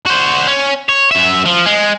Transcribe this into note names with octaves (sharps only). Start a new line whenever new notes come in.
F#4 C5
C#4
C#5
F#2 E5
F3
G#3